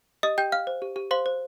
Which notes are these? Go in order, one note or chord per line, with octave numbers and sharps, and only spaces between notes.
G4 D#5 D#6
G4 G5 G6
F5 F6
C5
G4
G4
C5 F5 C6
C5